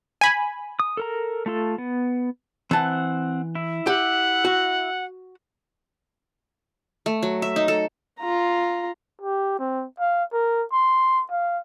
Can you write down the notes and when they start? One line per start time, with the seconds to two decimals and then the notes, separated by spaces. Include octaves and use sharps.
0.21 G#5 B5
0.79 D#6
0.97 A4 A#4 A#5
1.46 A3 F4 A4
1.78 B3
2.71 E3 C4 F#5 A5
3.55 E4
3.87 G4 F#5
4.45 F#4
7.06 A3
7.23 F#3
7.42 E5
7.56 D#4
7.68 A4
8.19 F4 A#5
9.22 G4
9.59 C4
10.00 F5
10.33 A#4
10.72 C6
11.31 F5